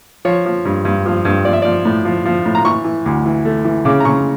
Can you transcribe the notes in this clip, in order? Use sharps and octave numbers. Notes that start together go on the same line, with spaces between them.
F3 C#5
F3
G2
G2
F3
G2
F3 D5
E5
F3 D5
A2
F3
F3
A2
A#5
E3 C#6
E3
D2
E3
A3
E3
C#3 D6
A#5
C#3 C#6